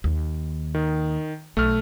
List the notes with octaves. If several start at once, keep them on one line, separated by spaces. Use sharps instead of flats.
D#2
D#3
B1 A3 F6